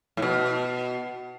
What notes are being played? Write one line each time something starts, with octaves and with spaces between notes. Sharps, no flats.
A2
B2